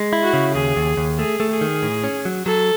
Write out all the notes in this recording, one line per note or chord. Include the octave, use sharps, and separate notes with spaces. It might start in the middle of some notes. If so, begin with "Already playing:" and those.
Already playing: G#3
E4
F#4
C#3
D#2 G#4
D#2
D#2
A3 G#4
A3
G#4
D#3
A2
C#4
F#3
F#3 A4